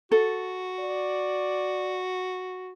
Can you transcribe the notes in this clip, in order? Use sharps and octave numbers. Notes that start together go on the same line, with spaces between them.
F#4 A4
D5